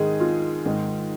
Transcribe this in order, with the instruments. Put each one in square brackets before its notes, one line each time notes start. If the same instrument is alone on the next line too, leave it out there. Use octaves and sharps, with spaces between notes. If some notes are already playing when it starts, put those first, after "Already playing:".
Already playing: [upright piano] G#2 D#3 G#3 G#4
F4
G#2 D#3 G#3